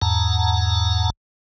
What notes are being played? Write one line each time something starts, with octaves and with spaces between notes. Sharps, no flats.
E2 G#2 F#5 A5 A#5